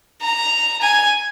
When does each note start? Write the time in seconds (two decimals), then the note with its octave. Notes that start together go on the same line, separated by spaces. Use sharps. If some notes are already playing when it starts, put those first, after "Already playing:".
0.22 A#5
0.81 G#5